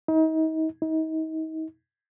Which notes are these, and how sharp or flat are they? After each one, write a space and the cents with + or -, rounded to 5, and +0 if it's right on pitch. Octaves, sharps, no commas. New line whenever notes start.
D#4 +35
D#4 +35